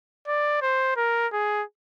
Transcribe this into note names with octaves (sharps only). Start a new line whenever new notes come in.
D5
C5
A#4
G#4